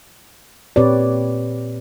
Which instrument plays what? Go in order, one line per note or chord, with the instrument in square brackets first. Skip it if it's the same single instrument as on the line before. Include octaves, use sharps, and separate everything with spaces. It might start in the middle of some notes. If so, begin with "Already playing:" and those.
[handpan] A#2 C4 G4 B4 C#5 D5